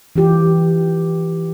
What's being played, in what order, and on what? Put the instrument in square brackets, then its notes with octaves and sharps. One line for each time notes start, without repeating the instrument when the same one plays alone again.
[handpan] E3 F4 G4